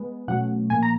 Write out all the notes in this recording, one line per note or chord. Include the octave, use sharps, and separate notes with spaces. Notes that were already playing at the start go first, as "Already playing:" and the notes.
Already playing: G#3 B3
B2 F#3 A3 C#4 F#5
A#2 F3 A#3 G#5
A#5